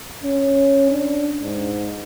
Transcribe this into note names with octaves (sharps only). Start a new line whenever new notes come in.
C#4
D4
G#2